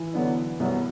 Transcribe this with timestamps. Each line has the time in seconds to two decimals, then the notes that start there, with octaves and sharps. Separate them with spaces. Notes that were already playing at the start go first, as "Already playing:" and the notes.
Already playing: E3 E4
0.14 D3 F#3 B3 D4
0.59 C2 B2 F#3 B3